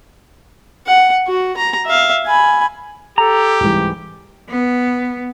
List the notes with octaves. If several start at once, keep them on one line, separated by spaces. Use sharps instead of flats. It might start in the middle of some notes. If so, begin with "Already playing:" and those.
F#5
F#4
A#5
E5 F5
G#5 B5
G4 A4 A#5
C2 G#2 E3
B3